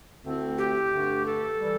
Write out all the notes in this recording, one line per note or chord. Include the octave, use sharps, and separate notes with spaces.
D2 D3 A3 C4 E4
G4
G2 D3 A3 D4
A4
E3 G3